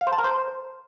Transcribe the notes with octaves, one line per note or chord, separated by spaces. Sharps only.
F5
C5
A5
A#4
C5